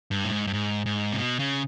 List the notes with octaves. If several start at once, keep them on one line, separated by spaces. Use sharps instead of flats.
G2
A2
G#2
G2
G#2
G#2
C3
B2
C#3